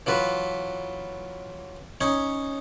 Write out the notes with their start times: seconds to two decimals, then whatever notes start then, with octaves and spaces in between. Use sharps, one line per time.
0.06 E3 F#3 F4 B4
2.01 C#4 D#4 C#5